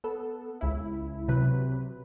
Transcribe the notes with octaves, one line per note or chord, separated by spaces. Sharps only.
B3 A4
C#2 E4
C3 F#3 B4